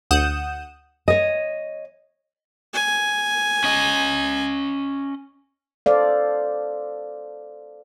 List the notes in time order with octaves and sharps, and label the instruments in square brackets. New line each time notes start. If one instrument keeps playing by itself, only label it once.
[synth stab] D2 F#5 D#6 G6 E7
[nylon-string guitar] C#5 D#5
[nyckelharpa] G#5
[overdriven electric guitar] C#4 D#5
[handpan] A4 C5 D5 F5